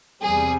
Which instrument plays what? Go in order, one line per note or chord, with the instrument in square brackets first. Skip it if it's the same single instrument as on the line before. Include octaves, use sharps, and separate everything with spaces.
[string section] E2 C3 G3 G#4